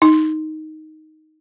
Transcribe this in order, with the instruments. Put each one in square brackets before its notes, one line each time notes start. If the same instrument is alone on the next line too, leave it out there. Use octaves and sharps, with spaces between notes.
[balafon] D#4